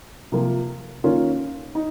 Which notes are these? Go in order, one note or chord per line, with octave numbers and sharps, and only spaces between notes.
C3 F3 A#3 F4
D#3 A#3 C#4 F4
D#4